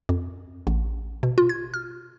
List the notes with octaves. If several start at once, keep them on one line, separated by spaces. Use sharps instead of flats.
F2
A1
B2
F4
G#6
F6